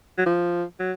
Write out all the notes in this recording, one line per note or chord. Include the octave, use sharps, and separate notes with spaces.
F#3
F3
F#3